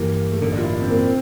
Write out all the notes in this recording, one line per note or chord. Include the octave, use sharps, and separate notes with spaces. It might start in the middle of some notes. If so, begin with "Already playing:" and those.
Already playing: G2 E3 G3 A#3
A3
A1 G2 D3 A#3
D4
F4
E4
D4
C4
A#3
C4